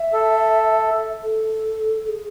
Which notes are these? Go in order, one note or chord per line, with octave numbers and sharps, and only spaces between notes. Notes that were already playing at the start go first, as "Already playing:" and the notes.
Already playing: E5
A4
A4
A4
G#4